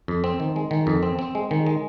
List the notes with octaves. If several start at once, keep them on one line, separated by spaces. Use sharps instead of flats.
F2
C4
D#3
G#3
D#3
F2
C4
C4
G#3
D#3
G#3